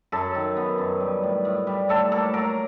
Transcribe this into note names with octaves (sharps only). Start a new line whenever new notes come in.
F#2 A4
D#3
B3
F#2
G3
A2
A2
G3
A2 A4
A#3 A4
F#3 A#4